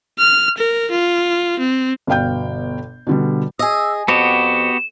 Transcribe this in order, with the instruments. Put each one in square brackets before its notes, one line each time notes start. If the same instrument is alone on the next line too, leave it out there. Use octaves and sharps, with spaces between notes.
[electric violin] F6
A#4
F4
C4
[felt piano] G1 B2 F5 G5 G6
B2 D3 G3
[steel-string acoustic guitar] G#4 D#5 [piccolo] E6
[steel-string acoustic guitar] F2 [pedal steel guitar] B3 F#4 G4 [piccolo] E7